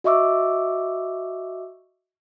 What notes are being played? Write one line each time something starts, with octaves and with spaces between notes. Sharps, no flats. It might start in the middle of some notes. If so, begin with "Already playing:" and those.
F#4 D#5 E5 C#6 D6 E6